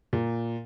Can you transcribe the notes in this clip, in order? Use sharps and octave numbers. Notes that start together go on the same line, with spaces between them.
A#2